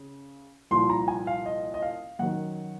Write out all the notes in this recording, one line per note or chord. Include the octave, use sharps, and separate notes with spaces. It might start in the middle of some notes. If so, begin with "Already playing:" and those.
Already playing: C#3
C2 A#2 F3 C6
A#5
G#5
F5
D#5
D#5
F5
F#2 D#3 F#3 F#5